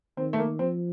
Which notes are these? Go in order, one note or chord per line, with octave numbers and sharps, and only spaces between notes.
D#3 C4
A3
A#3
F3 C4